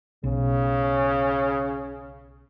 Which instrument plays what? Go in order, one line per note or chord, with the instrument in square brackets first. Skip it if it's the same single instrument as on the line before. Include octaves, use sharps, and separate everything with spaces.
[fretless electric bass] B1 [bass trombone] C#3